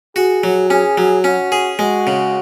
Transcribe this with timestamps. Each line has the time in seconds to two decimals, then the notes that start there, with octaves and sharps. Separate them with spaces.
0.16 F#4 G#4
0.44 F#3
0.70 C#4 G#4
0.98 F#3
1.24 C#4 F#4
1.52 G#4
1.79 G#3 F#4
2.07 C#3